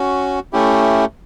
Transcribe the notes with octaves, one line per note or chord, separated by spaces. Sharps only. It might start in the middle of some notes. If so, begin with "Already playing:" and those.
Already playing: C#4 F#4
A3 C#4 E4 G4